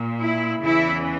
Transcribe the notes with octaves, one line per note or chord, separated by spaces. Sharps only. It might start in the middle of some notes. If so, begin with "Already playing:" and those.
Already playing: A#2
E4
E2 C#3 E3 E4